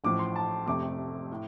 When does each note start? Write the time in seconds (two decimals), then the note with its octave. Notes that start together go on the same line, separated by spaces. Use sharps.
0.04 A1 A2 F3 A3 D6
0.19 C6
0.36 A5
0.66 F1 F2 C3 A3 D6
1.31 A2